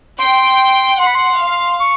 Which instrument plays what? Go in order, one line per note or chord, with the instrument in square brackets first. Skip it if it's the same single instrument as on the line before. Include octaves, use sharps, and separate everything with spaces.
[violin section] G5 [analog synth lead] C6
[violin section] F#5 [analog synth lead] C6
[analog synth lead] B5
C6
[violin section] F5
[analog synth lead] C#6